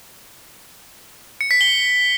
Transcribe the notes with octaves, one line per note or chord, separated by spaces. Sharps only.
C#7
B6
G7